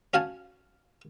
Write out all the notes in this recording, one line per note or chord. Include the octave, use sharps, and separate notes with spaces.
C#4 F#4 F5 F#5 G#5 A5